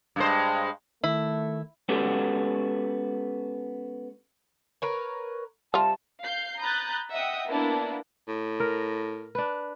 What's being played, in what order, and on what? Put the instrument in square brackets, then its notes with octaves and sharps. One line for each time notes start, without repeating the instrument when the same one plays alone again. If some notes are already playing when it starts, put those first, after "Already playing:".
[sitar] G2 G#3 C5
[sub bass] D#3 [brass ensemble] A3 [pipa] E4
[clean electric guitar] G#3 B3 C#4 F#4 G4 A4
[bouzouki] A#4 B4 C#5
[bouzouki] C3 [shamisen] G3 F4 [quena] A5
[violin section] F5 G6 C7
A#5 B5 D#6 F#6 G6 A6
D#5 E5 F#5 G5 D#6
A#3 B3 D4 E4
[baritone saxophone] A2
[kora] A#4
D4 B4